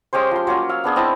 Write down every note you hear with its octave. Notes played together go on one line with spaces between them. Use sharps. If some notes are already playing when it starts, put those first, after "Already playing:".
G#3 C#4 G4 C5
F3 C6
F#3 A#3 C#4
F5 E6
B3 D4 G#4
C4 E4 D#5 A5